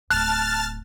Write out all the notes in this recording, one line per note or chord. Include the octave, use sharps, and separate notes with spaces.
D1 A5 F6 F#6 A6